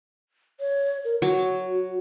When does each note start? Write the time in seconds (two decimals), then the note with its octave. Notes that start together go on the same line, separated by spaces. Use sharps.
0.60 C#5
1.05 A#4
1.22 F#3 F#4